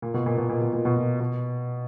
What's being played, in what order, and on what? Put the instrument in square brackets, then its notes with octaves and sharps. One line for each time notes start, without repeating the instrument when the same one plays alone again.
[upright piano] A#2
B2
A#2
B2
A#2
B2
A#2
B2
A#2
B2